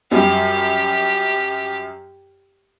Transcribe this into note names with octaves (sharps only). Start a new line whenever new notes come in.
F#2 G3 G4